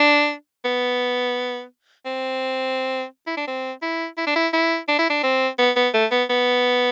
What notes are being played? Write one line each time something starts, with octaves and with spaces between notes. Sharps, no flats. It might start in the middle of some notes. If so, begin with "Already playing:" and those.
Already playing: D4
B3
C4
E4
D4
C4
E4
E4
D4
E4
E4
D4
E4
D4
C4
B3
B3
A3
B3
B3